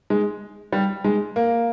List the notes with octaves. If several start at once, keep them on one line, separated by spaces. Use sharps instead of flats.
G#3
G3
G#3
A#3